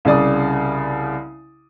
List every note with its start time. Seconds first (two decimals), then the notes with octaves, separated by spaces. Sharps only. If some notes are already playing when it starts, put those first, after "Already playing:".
0.05 C2 C#3 D5 D#6